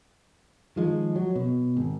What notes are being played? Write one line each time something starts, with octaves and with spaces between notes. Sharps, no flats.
D#3 F3 G#3
F#3
B2
G#1